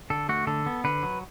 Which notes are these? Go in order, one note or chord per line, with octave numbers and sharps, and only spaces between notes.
D3 A4
A3 F#4
D3 A4
B3
D3 B4
F#3